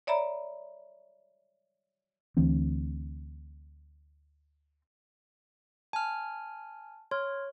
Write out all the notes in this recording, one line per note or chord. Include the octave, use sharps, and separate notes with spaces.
C#5 D5 E5 A#5 B5
D2 E3 C4
G#5 A5 F6
C#5 C6 F6